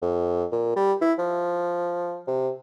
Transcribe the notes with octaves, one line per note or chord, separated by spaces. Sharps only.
F2
A#2
G3
E4
F3
C3